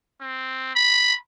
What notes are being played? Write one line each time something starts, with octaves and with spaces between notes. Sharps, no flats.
C4
B5